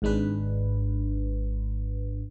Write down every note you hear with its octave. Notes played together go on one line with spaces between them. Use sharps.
G#1 G#2 G#3 D4 B4